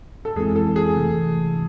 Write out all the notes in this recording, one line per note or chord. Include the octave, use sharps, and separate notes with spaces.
A4
F2 E3 G#3 C4 E4 G#4
A4
G#4
C3 E3 A3